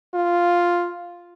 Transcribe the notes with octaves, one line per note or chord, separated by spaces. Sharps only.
F4